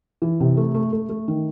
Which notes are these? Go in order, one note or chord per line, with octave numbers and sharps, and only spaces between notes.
E3
C3
A3
A3
A3
A3
D#3